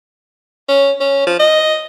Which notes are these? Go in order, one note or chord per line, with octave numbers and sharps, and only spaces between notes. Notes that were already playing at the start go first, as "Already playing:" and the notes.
C#4
C#4
F3
D#5